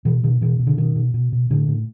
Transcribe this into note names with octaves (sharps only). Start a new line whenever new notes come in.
B2 E3
B2 D#3
B2 E3
B2
D3
B2 D#3
B2
B2
B2
A2 D3
A2